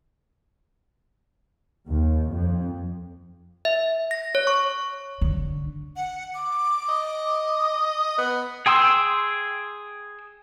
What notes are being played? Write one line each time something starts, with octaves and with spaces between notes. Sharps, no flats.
D#2
F2
E5
A#6
C#5
C#6
D3
F#5
D6
D#5
B3
G#4 G5 C6 E6